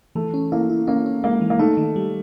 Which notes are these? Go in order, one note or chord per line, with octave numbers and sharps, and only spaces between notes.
E3 A3
C#4
A#3 E4
E4
A#3 C#4
C#4
G#3 A#3
E3
A#3
A3 D#4
D#3
G3